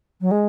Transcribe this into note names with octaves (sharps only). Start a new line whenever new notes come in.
F#3
G#3